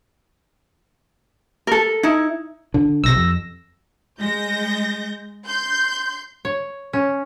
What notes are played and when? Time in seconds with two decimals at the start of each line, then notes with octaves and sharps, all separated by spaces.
1.67 A4 A#4
2.03 D#4 E4
2.74 D3
3.04 B1 C3 E6 A#6
3.16 F2
4.20 G#3 G6 A#6
5.48 C6 G6
6.45 C#5
6.93 C#4